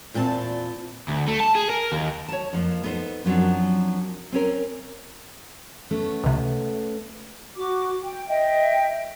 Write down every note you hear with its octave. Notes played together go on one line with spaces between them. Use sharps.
E2 A#2 C4 A5
D2
A3
A5
G#4
A#4
D#2
C#5 A5
F2 F3 A#3
B3 D#4 A4 B4 C5
F#2 F3 F#3 C4 D4
C4 C#4 A#4
A3 B3 C#4
C#2 C3
F#4 D6
G5
D#5 E5 G5